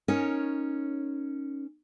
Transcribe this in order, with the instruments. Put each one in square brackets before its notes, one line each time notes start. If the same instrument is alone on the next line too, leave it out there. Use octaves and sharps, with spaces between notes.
[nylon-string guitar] C#4 D#4 A#4 C#5